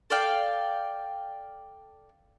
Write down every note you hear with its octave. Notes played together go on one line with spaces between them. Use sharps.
A4 D5 F5 G5